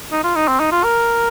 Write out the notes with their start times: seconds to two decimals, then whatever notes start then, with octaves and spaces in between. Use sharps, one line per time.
0.12 D#4
0.24 F4
0.36 D#4
0.48 C4
0.60 D#4
0.72 F4
0.84 A#4